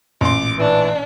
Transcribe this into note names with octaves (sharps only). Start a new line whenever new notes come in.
A1 A#2 C6 D6
E3 D4